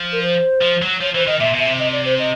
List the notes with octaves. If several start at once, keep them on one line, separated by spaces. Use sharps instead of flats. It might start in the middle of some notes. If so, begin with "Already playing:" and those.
Already playing: F3
A#4
C5
F3
F#3
F3 C#5
E3 C5
D#3 D#5
A#2 E5
B2
E5
C3
D#5
D5
C5
D#5